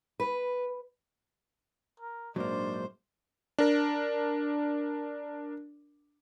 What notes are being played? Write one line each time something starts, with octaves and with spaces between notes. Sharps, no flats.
B4
A#4
A#1 G#2 F#3 A#3 D4 C5 D5
D4 A#4